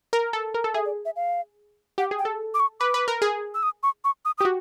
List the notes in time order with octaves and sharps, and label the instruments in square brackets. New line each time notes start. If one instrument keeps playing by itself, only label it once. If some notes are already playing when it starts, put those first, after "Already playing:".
[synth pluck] A#4
A4
A#4
A4
[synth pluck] G#4 [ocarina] E5
[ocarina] D5
E5
F5
[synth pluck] G4 [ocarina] F#5
[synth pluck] G#4
[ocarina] G5
[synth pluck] A4
[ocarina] D6
C#6
[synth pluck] B4 [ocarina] D6
[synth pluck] B4
A#4
G#4
[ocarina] E6
D#6
C#6
C#6
D#6
D#6
[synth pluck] G4
F#4